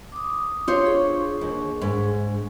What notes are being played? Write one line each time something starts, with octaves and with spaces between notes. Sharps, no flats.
D6 D#6
F4 C5 C#5
D4 G#4 C#6
D#2
G#2